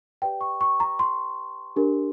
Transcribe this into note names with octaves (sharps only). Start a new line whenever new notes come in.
G4 B4 D5 G5
C#6
C#6
A#5
C6
D4 G4 A#4